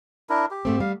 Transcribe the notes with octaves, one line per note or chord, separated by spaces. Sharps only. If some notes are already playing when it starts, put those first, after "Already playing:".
D4 E4 A#4
G4
G#2 A3 C4
G3 F5